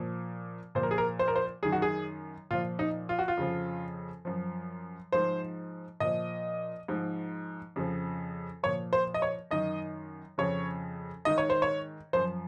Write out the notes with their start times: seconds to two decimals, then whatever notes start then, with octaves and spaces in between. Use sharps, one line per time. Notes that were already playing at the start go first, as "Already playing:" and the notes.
Already playing: A#2 F3
0.75 A#2 C5
0.79 F3 A#4
0.91 G#4
0.98 A#4
1.19 C5
1.28 A#4
1.36 C5
1.63 F#2 D#3 G#4
1.72 F#4
1.82 G#4
2.51 A#2 F3 F4
2.79 D#4
3.09 F4
3.19 F#4
3.28 F4
3.37 F2 C#3 F3
4.25 F#2 F3
5.12 G#2 F3 C5
6.00 A#2 F3 D#5
6.88 G#2 F3
7.76 F2 C#3 F3
8.63 A#2 F3 C#5
8.93 C5
9.14 D#5
9.22 C#5
9.51 F#2 D#3 D#5
10.38 F2 C#3 F3 C#5
11.25 G#2 D#3 D#5
11.38 C#5
11.50 C5
11.62 C#5
12.13 F#2 F3 C5